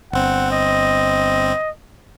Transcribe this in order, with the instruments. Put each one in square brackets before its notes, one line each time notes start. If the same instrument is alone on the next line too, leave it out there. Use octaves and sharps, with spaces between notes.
[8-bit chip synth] G1 C4 [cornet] F#5
[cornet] D#5